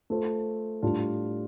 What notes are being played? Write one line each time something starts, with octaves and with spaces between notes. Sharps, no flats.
A3 F4 A4 C5
A2 G3 D4 F4